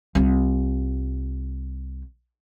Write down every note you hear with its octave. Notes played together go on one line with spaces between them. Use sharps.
C2 F4